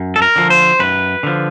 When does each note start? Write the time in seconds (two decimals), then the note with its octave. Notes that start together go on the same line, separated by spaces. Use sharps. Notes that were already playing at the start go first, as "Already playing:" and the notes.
Already playing: F#2
0.16 A4
0.22 A#4
0.36 D3 F3
0.50 C5
0.79 F#2 B4
1.23 D3 F3